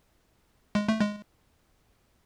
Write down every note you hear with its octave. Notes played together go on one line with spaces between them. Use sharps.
G#3
A3
G#3